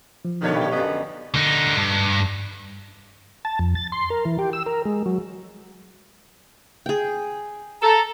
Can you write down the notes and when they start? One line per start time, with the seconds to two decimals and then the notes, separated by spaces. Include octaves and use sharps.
0.25 F3
0.41 G2 A#2 D3 D#3 C#5
0.55 D#5 G5 B5
0.72 F#2 D3 B3 D#5
1.34 D3 D#4
1.76 G2
3.45 A5
3.59 F2
3.75 A6
3.92 C6
4.10 A#4
4.25 E3
4.39 G4
4.53 E6
4.66 A#4
4.85 G#3
5.06 F#3
6.86 G#4 G5
7.82 A4 A#5